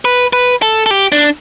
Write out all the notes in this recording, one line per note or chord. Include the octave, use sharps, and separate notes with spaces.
B4
B4
A4
A4
G4
D4